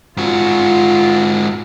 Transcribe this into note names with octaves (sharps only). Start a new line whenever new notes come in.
G#2 F4 F#4